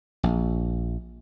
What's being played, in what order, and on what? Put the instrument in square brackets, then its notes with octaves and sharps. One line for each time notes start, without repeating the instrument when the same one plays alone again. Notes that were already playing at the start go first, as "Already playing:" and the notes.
[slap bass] A#1